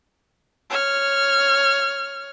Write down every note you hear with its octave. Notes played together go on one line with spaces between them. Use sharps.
C#5 F6